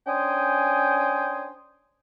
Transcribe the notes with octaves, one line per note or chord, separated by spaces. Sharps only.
C#4 D4 C5 G5 G#5 D#6